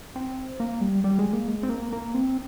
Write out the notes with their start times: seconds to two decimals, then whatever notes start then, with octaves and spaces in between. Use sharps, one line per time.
0.16 C4
0.60 A#3
0.81 G3
1.04 G3
1.19 G#3
1.33 A#3
1.48 G#3
1.63 C4
1.69 A#3
1.92 A#3
2.14 C4